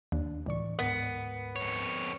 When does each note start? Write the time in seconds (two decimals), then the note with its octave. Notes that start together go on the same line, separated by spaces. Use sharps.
0.12 D#2 D4
0.46 C#2 A2 E3 D5 C#6
0.79 D2 G#2 B3 A#4
1.56 F2 C#5